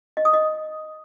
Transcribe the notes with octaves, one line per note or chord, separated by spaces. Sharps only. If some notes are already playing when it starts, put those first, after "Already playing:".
D#5
D#6
D#5